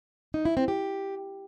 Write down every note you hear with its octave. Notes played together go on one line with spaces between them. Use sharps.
D#4
E4
C4
G4